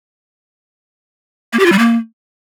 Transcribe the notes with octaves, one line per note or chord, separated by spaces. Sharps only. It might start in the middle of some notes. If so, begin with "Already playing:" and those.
A#3
G4
F4
G3
A#3